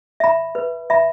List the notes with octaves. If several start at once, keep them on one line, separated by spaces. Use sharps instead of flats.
E5 B5
B4
E5 B5